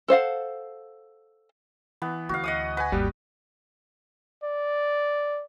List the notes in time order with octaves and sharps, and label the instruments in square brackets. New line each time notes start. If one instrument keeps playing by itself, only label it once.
[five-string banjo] A4 C5 F5 F#5
[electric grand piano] E3 [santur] B3
[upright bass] D2 [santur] F#4 F5
[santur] D#5 F#5 D#6
[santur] B4 [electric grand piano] F#5 G#5
[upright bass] G#1 D#2 [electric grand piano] G3 G4
[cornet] D5